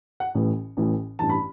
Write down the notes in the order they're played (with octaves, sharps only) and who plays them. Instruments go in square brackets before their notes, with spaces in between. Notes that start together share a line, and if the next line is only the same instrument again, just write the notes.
[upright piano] F#5
A1 A2 E3
A1 A2 E3
A1 G2 E3 A5
B5